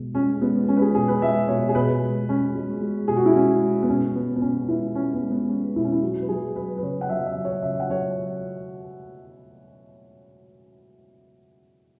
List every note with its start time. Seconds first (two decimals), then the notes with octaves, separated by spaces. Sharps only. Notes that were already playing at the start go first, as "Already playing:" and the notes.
Already playing: B2 G#3
0.14 G#3 C#4
0.42 G#3 B3
0.68 G#3 C#4
0.77 B4
0.82 G#4
0.95 B2 G#4
1.08 B4
1.22 G#3 E5
1.48 B2 C#5
1.69 G#4
1.75 B2 B4
2.02 G#3
2.29 G#3 C#4
2.55 G#3
2.81 G#3
3.08 B2 G#4
3.17 F#4
3.26 E4
3.35 G#3 C#4
3.62 G#3
3.83 B3
3.89 B2 C#4
4.15 G#3 B3
4.36 B3
4.41 B2 C#4
4.68 G#3 E4
4.95 G#3 C#4
5.14 B3
5.23 G#3
5.32 B3
5.49 G#3 C#4
5.76 B2 E4
5.84 C#4
5.92 E4
6.02 F#3 F#4
6.21 B4
6.29 F#3 G#4
6.56 F#3 B4
6.77 B4
6.82 C#3 C#5
7.01 F#5
7.09 F#3 E5
7.26 E5
7.36 F#3
7.44 C#5
7.62 C#3 E5
7.80 F#5
7.89 F#3 C#5